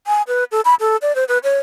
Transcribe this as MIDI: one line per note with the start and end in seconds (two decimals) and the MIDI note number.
0.07 0.22 80
0.28 0.44 71
0.52 0.61 69
0.65 0.74 83
0.80 0.97 69
1.02 1.15 74
1.15 1.24 72
1.28 1.38 71
1.44 1.60 73